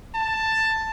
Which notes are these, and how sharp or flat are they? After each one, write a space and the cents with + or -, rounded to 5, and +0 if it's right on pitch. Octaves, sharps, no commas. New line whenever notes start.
A5 +10